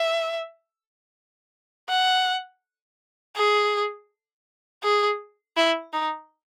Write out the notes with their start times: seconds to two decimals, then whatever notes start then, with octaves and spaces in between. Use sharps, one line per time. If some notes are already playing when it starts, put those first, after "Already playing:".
Already playing: E5
1.89 F#5
3.36 G#4
4.84 G#4
5.57 E4
5.93 D#4